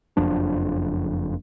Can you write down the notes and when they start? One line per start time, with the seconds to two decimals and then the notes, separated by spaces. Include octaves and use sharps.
0.17 F#1 F2 F3 D4